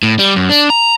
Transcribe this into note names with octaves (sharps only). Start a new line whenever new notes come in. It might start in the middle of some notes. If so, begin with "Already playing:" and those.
A2
G3
F#2
D4
A#5